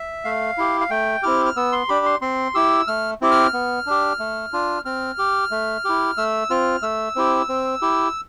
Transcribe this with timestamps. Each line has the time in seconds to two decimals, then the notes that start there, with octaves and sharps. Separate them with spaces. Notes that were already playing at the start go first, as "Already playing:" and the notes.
Already playing: E5
0.24 A3 F5
0.58 E4 G4
0.81 F5
0.90 A3 G5
1.23 C4 E4 G4 F6
1.46 F6
1.56 B3 E6
1.72 C6
1.89 D4 G4 B5
2.06 C6
2.21 C4 C6
2.55 E4 G4 E6
2.87 A3 F6
3.21 C4 E4 G4
3.31 F6
3.53 B3
3.87 D4 G4
4.19 A3
4.53 D4 F4
4.85 C4 F6
5.18 G4
5.51 A3
5.85 E4 G4
6.17 A3 E6
6.50 C4 F4 F6
6.82 A3 E6
7.16 C4 E4 G4
7.49 C4
7.82 E4 G4